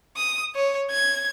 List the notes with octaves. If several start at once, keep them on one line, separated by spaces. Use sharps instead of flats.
D#6
C#5
G#6